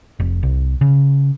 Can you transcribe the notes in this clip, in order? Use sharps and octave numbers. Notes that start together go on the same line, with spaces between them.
F1
C2
C#3